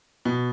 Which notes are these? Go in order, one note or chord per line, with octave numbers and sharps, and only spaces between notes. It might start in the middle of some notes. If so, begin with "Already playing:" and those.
B2